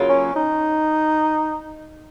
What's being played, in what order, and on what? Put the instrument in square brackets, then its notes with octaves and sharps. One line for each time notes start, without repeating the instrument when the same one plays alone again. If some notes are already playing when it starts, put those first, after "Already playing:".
Already playing: [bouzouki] C#3 F#3 A#3 F4
[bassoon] C#4
D#4